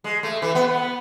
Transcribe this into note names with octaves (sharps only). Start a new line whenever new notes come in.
G#3
A3
E3
B3
B3